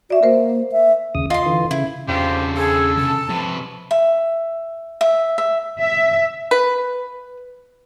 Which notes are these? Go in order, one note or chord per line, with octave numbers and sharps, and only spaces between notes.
F#4 D5 E5
A#3 A#4 C5
E5
D#2 C#3 D#6
F4 D#5 C6
D3 E3
C#3 E4
E2 C#3 C4 D4 F4 G4
G#4 A4
C3 A5
C3 F3 B4
E5
E5
E5
E5
B4